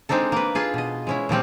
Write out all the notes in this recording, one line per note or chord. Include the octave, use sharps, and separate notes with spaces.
G#3 C4 D4 D#4 A4
A#3 B4
F4 G#4 A4
B2 D#5
G#3 C#4 E4
A#2 F3 G3 C4